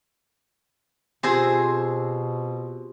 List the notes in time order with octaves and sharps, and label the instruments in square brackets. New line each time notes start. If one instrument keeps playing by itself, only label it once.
[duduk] B2 [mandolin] C4 G#5 [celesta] F4 G4 [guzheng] G#4 C5